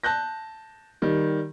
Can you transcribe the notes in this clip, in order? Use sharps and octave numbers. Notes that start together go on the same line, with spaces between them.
A5 F#6 G6 A#6
D#3 G3